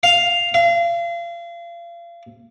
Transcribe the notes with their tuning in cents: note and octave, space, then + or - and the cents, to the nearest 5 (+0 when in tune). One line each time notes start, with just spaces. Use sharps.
F5 +0
F5 -35